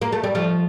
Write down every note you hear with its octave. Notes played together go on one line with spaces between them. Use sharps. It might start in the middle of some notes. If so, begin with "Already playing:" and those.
A#3
A3
G3
F3 A3